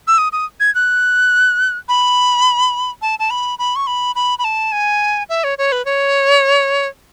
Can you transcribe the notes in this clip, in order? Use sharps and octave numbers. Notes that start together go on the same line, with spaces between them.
E6
D#6
D#6
G#6
F#6
B5
A5
A5
B5
B5
C#6
B5
B5
B5
A5
G#5
E5
C#5
C#5
B4
C#5